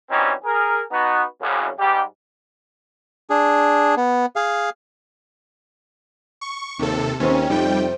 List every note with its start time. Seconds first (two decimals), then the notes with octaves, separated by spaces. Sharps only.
0.10 E3 G3 C4 C#4 D#4 F#4
0.45 G#4 A#4
0.92 B3 D#4 F#4
1.42 C2 F#2 C#3
1.80 G#2 G3 G4
3.30 D4 G#4
3.97 B3
4.36 G#4 F5
6.41 C#6
6.79 D#2 C3 A4
7.20 D#2 D#3 C4 C#4 C5
7.50 F2 C3 G3 D#4 G5